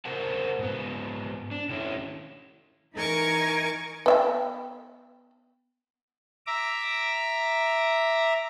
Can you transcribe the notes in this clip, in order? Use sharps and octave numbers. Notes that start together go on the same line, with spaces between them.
G#4 A#4 C5 F#5 A5
G#2 B3
D4
D#3 C#4 E4
E3 D#4 A#4 G#5 C#6 D6
B3 E5 G5
E5 A#5 D6